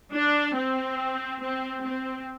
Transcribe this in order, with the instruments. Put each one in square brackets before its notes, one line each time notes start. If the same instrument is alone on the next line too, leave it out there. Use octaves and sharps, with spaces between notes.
[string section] D4
C4
C4
C4